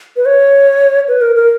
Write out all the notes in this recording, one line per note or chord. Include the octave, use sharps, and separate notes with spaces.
B4
C#5
B4
A#4
A#4